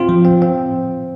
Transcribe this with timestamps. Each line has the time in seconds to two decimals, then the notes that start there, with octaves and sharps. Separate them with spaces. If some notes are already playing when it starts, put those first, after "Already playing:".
Already playing: C4 F4
0.09 F3
0.25 C4
0.42 C4